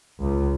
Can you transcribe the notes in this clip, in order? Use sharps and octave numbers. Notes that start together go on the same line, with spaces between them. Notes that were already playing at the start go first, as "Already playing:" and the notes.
C#2